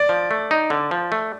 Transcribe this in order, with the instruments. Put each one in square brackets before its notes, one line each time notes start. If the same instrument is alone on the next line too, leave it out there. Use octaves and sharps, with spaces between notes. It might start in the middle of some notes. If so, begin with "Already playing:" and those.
Already playing: [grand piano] D5
[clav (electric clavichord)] F3
A3
D#4
D3
F3
A3